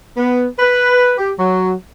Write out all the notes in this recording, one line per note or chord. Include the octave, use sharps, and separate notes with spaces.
B3
B4
G4
F#3